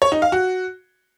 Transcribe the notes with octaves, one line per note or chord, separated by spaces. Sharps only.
C#5
D#4
F5
F#4